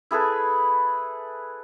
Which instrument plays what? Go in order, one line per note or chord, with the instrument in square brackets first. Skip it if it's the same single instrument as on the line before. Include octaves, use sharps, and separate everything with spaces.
[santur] E4 G#4 A4 B4